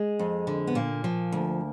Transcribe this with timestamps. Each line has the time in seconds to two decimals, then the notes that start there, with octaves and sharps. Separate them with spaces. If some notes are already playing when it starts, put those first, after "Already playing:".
Already playing: G#3
0.19 F2
0.47 D3
0.67 B3
0.75 A#2 A#3
1.04 F3
1.32 D2